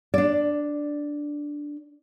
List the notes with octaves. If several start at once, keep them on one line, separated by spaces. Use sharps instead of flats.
D4 D5